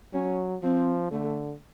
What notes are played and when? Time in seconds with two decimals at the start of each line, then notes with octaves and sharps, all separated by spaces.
0.13 F#3 C#4
0.63 F3 C4
1.11 D3 A3